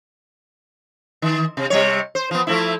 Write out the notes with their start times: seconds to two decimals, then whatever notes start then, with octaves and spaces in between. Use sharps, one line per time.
1.22 D#3
1.57 C3
1.70 C3 G3 C#5
2.15 C5
2.31 F3 B3
2.47 F3 A3 E4